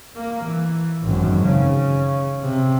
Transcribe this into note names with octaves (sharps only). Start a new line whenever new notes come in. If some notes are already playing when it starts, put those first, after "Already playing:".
A#3
E3
G#1 F#2
C#3
C3